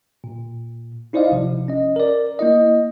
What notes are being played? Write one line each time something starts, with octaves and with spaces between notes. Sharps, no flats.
A#2
D#4 E4 C5 D5 D#5 F5
G#1 C3 F3
C#4 D#5
A#4 D5
A#3 E4 D#5